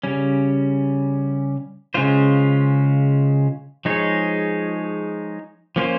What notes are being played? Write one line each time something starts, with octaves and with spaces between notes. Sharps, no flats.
C#3 G3 C#4
C#3 G#3 C#4 F4 C5
F3 G#3 D#4 G#4 C#5
F3 A#3 C#4 F4 C5